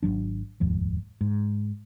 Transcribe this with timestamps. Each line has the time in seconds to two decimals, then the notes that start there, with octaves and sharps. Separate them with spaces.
0.03 G#1 E2 F#3 D4
0.60 F1 D#2 G#2 F3
1.21 G#2